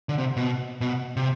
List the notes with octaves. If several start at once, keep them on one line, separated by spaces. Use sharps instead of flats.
D3
C3
B2
B2
C3